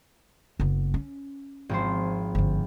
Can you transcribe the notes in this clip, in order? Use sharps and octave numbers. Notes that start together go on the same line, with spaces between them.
F#1 B3
C#4
G#1 F3 C5
G1 A3